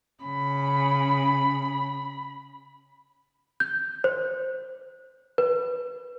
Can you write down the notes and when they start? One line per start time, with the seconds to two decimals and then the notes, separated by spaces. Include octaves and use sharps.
0.24 C#3 B5
3.60 G6
4.04 C5
5.38 B4